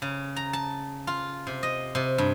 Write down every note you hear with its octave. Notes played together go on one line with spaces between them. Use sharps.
C#3
A#5
A5
F4
C3
D#5
C3
G2